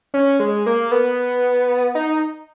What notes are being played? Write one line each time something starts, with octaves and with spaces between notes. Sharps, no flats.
C#4
G#3
A#3
B3
D#4